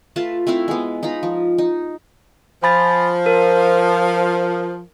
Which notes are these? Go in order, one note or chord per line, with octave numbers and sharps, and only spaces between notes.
A3 F4 B4 A5
A3 C4 E4 F5
G#3 B3
D#4 F4 A#5 B5
F3
D#4
F3 G#5 B5 A6
A#4